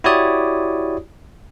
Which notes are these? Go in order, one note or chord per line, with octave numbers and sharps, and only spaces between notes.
E4 F#4 G4 C#5 D5 D#6